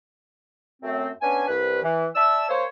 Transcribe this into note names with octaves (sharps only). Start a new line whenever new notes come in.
F#2 A3 C4
B3 C#4 D4 G#5
C2 B4
E3
D5 E5 A5 E6
A#3 C5 C#5